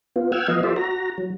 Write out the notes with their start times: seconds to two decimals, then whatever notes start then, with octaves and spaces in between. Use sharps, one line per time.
0.16 B3 F4
0.32 F#5 G5 E6 F6 G#6
0.48 F3 B3 D#5 F5
0.63 F4 G4 A4 C5 D5 E5
0.76 F#4 A#5
1.18 F#3